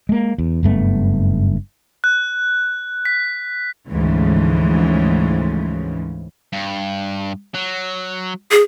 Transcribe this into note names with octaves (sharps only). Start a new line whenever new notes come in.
G#3 A#3
E2
F#1 G2 A3 B3
F#6
B6
D2 G#2 C#3 E3 F3
G2
F#3
G#4